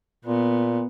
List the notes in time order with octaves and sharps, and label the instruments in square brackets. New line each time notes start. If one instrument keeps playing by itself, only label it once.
[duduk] A#2 [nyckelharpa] B3